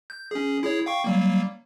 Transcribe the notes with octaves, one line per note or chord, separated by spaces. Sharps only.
G6
C#4 G#4
E4 G#4 C#5
F5 G5 C#6
F#3 G3 A#3